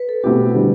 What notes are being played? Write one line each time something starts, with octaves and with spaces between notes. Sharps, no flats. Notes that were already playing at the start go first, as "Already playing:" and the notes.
Already playing: B4
A4
B2 A3 C4 E4 F#4 G4
D3 G3